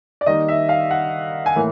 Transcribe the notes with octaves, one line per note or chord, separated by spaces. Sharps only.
D5
D#3 G3 A#3 D#4 D#5
E5
F5
F#5
G#5
A2 E3 A#3